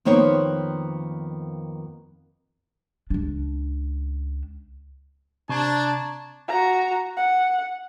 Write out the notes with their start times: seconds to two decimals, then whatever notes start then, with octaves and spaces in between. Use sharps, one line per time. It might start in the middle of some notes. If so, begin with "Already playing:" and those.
0.05 F2 D#3 A#3 B3 C5 C#5
3.10 C#2 D4
5.49 C3 D4 A5 A#5 C#6 G#6
6.48 F#4 A#5
7.17 F#5